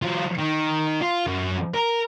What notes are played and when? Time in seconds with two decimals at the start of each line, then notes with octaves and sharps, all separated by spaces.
0.02 F#3 F4
0.38 D#3
1.02 F4
1.27 F#2
1.74 A#4